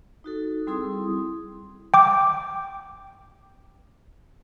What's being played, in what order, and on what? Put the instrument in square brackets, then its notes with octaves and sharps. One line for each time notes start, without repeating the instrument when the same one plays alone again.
[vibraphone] D#4 F#4 A4
G3 C4 E4 G#4 C6 D#6
[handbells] G5 D6